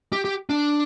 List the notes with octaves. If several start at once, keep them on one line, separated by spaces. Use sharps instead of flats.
G4
G4
D4